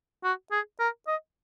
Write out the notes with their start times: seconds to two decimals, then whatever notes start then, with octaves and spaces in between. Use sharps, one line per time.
0.24 F#4
0.52 G#4
0.80 A#4
1.07 D#5